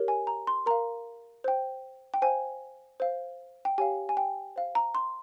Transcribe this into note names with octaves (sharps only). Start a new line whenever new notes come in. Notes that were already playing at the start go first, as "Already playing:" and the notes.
Already playing: G4 A#4 C#5
G#5
A#5
C6
A#4 F5 A#5
C5 G5
G5
C5 F5 G#5
C5 F5
G5
G4 C#5 F5 G#5
G#5
G5
C5 F5
A#5
C6